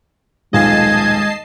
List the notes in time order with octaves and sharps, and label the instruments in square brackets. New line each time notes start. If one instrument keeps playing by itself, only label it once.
[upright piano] D#1 B1 F4 [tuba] G#3 [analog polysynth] D#5 A5 C7 [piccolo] G#6